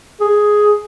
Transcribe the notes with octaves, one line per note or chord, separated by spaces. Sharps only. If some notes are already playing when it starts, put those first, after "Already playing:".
G#4